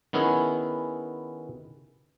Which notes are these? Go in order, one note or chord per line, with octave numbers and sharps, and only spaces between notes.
D#3 B3 C#4 E4 G#4